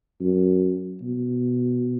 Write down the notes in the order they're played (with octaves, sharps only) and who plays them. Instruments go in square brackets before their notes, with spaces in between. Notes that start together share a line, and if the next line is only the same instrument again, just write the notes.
[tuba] F#2
B2